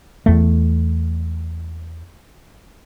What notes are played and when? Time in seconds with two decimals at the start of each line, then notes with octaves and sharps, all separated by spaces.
0.26 E2 A3